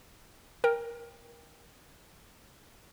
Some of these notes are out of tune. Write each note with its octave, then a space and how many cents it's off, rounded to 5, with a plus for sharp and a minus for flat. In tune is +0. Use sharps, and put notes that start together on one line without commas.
A#4 +10 G5 +15